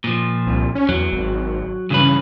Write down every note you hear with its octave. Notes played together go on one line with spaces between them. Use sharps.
A#2 F3
C2
C#4
E2 F#3
G#1
G2 C#3 E3 B4